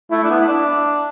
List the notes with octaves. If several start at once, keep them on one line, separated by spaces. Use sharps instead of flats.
A3 E4
D4
B3
E4
D4